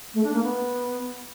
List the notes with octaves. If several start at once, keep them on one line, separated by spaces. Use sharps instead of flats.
A3
D4
A#3
B3